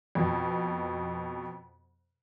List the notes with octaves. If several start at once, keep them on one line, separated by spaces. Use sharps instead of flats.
F2 B2